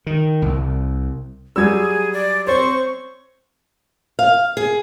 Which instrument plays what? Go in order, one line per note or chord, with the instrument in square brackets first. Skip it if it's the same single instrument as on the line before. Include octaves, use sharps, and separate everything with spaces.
[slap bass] D#3
C2
[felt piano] F#3 G3 [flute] G#4 [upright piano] E6 G#6
[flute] D5
[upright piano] C4 C#5 [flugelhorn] C5 [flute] C#6
[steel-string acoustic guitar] F5
G#4